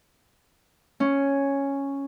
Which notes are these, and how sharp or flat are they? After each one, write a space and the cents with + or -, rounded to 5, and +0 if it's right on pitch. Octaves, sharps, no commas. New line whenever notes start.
C#4 +0